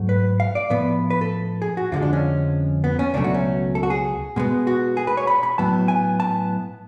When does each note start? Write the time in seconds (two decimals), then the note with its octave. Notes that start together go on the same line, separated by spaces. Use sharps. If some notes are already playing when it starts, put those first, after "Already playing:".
Already playing: G#2 F#3 A3
0.09 B4
0.40 F5
0.55 D5
0.70 A2 F3 B3 B4
1.10 B4
1.21 A4
1.62 G#4
1.77 F#4
1.92 F2 D3 F3 G#3 F4
2.02 D4
2.13 C#4
2.84 B3
2.99 C#4
3.14 C#2 B2 F#3 A3 D4
3.24 F#4
3.34 C#4
3.75 A4
3.83 F#4
3.90 G#4
4.36 B2 G#3 B3
4.67 F#4
4.97 G#4
5.07 B4
5.17 C#5
5.27 B5
5.43 B5
5.58 A2 F#3 B3 A5
5.88 G#5
6.20 A5